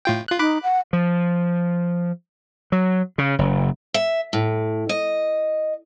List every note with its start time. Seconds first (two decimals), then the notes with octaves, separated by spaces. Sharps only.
0.05 A2 F4 G5
0.28 F4 F#6
0.39 D#4 B5 D6 F#6
0.63 F#5
0.93 F3
2.72 F#3
3.18 C#3
3.39 F#1
3.94 E5
4.33 A2
4.89 D#5